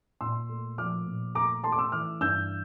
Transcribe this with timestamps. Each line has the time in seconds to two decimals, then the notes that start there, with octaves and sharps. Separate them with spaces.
0.21 A#2 C6 E6
0.49 A3
0.78 F3 D6 F6
1.06 A#2
1.35 A3 A#5 D6
1.63 A3 A5 C6
1.72 D6
1.78 C6 E6
1.92 E3 D6 F6
2.21 G2 E6 G6